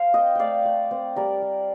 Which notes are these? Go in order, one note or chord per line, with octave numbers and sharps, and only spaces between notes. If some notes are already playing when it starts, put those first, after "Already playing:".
Already playing: C5 F5
C4 D#5 G5
A3 D5 F5 G5
A3
C4
G3 A#4 D5
G3